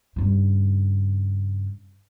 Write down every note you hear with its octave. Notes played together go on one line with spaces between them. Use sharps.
G2 C#3